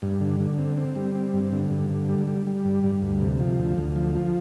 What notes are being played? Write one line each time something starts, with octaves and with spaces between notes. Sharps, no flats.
G2
D3
D3
C4
C4
G3
C4
G2
D3
G2
D3
G3
G3
G3
G2
G2
D2
C3
F3
D2
D2
F3
F3